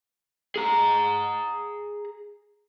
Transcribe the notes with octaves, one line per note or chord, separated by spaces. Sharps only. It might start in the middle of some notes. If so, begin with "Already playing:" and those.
G#4 A#5